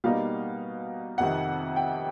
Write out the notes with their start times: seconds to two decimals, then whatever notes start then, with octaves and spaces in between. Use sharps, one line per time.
0.04 B2 G3 A#3 D#4 F5
1.18 F2 C3 D#3 F#5
1.76 G5